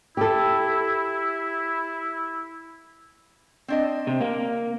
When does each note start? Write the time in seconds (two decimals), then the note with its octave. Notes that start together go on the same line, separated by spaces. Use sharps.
0.17 E4 G4 A4
3.68 C4 D4 D#5
4.07 C3
4.21 A#3